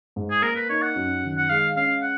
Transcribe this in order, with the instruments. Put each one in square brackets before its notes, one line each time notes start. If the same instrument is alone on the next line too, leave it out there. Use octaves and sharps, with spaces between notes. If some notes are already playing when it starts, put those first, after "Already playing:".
[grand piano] G#2
[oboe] G#4
[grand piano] A#3 [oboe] A#4
[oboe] B4
[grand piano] D#4 [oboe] C#5
[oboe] F#5
[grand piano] F#2
D#3
[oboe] F#5
[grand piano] G#3 [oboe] F5
[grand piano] C#4 [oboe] F5
[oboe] F#5